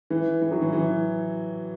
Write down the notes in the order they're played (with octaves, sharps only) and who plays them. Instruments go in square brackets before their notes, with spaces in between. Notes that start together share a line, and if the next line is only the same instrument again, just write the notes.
[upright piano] E3
E3
F#3
E3
E3